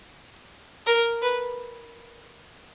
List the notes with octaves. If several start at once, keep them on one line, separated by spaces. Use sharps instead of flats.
A#4
B4